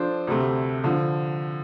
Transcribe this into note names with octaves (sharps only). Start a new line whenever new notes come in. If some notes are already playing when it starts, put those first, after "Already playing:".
Already playing: F3 D4 A4 C5
D2 C3 A3
D3 F3